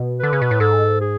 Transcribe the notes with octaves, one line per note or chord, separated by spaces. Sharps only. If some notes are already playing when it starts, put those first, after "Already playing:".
Already playing: B2
D3 B4
C#3
B2
A2
G#2 A4
G#4